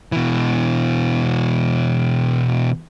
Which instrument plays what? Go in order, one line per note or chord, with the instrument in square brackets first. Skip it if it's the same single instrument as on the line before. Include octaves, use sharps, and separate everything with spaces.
[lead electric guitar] B2 E3